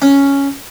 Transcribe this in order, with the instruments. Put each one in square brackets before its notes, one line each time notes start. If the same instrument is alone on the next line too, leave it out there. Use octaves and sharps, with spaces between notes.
[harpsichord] C#4